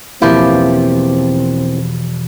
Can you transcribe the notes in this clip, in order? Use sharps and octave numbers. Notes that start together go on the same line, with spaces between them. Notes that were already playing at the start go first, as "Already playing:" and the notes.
E2 B2 E3 F3 A#3 C4 E4 G4